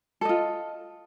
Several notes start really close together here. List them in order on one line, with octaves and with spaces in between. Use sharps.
A4 D#5 F4